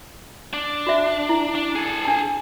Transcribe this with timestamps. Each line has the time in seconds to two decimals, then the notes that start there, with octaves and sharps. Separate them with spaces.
0.53 D4
0.87 F#4 E5
1.29 E4
1.55 D4
1.76 G#4 A4
2.05 D4 A5